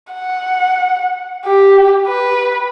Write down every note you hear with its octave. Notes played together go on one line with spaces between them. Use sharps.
F#5
G4
B4